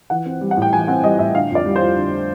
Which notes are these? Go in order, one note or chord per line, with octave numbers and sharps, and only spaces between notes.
E3 F#5
C4
G3
F#5
A2
G5
E3 G#5
C4 F#5
G3 D#5
A2 E5
D3 F5
F2 D5
G3
C5
F2
D3